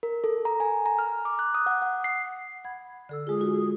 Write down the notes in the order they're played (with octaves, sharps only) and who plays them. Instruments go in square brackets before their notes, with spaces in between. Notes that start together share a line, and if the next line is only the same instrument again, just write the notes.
[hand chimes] A#4
A4
A#5
G#5
A#5
F6
D6
F#6
D#6
F#5
F#5
C7
[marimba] F#5 B5 G#6
D3 A4 E6
[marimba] G#3 F4 [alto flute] G#4
[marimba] D#4 F#4